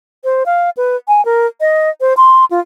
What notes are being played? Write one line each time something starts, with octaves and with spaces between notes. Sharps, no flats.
C5
F5
B4
G#5
A#4
D#5
C5
C6
F4